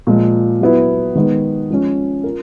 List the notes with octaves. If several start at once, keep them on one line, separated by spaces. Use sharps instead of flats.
A#2 F3 G#3
F#3 B3 E4
D#3 G#3 B3
F3 G#3 C#4
F4 A#4